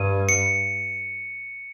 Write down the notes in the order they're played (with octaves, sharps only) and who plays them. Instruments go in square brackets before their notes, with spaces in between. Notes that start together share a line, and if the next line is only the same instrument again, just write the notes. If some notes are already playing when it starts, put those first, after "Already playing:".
Already playing: [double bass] G2 [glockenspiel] D#7
[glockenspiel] C#7